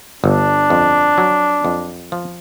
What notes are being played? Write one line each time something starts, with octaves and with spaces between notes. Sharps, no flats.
G1 D4
F2
F#3
F2
F3